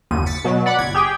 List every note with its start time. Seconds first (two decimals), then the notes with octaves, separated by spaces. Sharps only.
0.11 G1 D#2 D#7
0.26 A6 B6 C#7
0.45 B2 F#3
0.66 D5 F#5 B5
0.79 G1 G#6
0.95 G4 G#4 G5